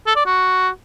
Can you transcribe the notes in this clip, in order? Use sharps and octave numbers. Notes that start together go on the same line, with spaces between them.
A4
D5
F#4